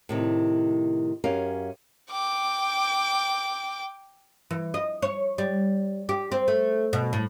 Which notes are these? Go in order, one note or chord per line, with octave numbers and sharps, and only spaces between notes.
A2 C3 D#3
F#2 C#4 G4 A#4 F5
G5 D6
E3
D#5
C#5
G3
G4
C4
A3
B2
A2